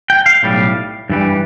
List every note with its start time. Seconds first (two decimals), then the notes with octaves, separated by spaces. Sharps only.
0.10 G5
0.26 F5
0.43 B1 A2 G3
1.10 G2 E3 G3